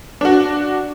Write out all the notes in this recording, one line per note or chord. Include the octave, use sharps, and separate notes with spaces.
D4 F#4